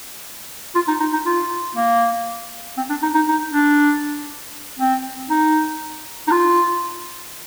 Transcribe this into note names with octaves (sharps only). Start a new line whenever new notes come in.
F4
D#4
D#4
D#4
F4
A#3
C4
D4
D#4
D#4
D#4
D4
C4
D#4
D#4
F4